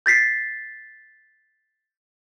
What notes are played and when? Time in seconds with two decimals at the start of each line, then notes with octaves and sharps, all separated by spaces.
0.06 G6 A6 B6 C7